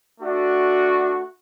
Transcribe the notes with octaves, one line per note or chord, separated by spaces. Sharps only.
A3 D4 F#4